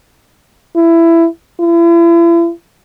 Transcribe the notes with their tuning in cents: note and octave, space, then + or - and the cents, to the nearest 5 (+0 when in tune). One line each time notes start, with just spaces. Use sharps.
E4 +15
E4 +40